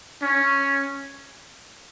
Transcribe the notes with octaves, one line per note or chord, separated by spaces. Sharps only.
C#4